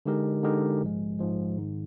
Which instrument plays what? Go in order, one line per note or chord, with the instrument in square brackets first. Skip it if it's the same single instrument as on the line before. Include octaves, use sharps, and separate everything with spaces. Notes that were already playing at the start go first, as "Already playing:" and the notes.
[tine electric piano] D3 G#3 D#4 G4 A#4
D3 G#3 D#4 G4 A#4
A#1 G#2 F3 G#3
A#1 G#2 F3 G#3
G#1 G#2 D#3